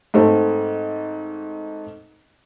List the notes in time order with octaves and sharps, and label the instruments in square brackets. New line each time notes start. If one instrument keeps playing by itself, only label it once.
[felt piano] G#2 A3 C4